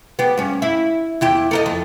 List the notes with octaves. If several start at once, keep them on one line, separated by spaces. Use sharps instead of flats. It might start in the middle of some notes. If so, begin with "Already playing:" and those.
B3 G4
G2 C#4
E4
E2 E4 G4
A4 A#4 D#5
F2